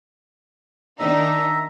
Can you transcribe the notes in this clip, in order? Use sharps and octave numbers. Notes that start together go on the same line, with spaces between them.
D#3 D4 D#4 E5 A#5